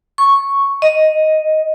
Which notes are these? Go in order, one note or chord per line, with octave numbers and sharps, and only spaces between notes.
C#6
D#5